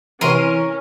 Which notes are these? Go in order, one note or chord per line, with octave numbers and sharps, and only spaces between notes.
C3 E3 C#4 A#4 C6 D#7